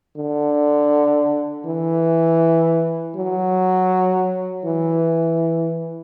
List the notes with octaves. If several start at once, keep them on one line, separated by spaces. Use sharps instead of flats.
D3
E3
F#3
E3